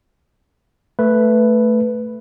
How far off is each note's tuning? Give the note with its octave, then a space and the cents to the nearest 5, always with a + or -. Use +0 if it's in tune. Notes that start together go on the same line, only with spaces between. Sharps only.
A3 +5 B4 +0